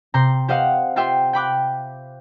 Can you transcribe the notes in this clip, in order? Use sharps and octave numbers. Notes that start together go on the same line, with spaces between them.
C3 A#5 C6 G6
G4 C5 D#5 F5 F#5
F4 G4 E5 G5 C6 E6
G5 B5 D6 F#6